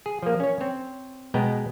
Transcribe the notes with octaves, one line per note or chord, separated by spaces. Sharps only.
G#4
F3 A#3
C#4 C#5
C4 C#5
B2 G#3 B3 G5 A#5